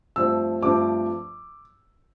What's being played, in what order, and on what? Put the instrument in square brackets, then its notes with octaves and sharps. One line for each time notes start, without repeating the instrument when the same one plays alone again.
[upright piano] G2 F3 A3 C4 E6
G2 F3 A3 C4 D6